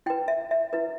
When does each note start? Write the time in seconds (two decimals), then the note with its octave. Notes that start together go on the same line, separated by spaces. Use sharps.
0.06 E4 G5
0.10 B4
0.28 E5
0.51 E5
0.73 E4 B4